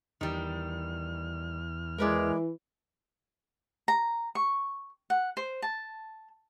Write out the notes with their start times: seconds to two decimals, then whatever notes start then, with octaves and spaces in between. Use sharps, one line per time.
0.21 E2 D#3 G3 F6
1.98 E3 G#3 E4 A#4 B4 D5
3.88 A#5
4.35 C#6
5.10 F#5
5.37 C5
5.62 A5